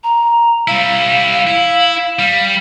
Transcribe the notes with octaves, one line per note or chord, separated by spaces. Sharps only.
A#5
G3 E4 F5
E4
G3